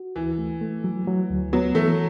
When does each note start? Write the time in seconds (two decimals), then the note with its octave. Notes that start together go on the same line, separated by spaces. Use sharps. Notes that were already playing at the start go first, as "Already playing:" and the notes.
Already playing: F#4
0.16 D2 E3
0.38 A3
0.61 A3
0.84 F#3
1.08 F#3
1.30 D2
1.53 F#3 B3
1.75 E3 A3